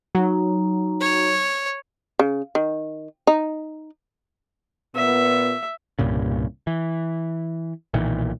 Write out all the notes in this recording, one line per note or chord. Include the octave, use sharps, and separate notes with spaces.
F#3 D#4 A#5
C#5
C#3
D#3
D#4
A#2 B3 E5
C2 G2 A#2 C#3
E3
B1 A#2 D#3 E3